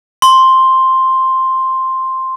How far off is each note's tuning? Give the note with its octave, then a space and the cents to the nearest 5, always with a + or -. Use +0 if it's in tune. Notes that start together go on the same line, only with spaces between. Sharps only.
C6 +5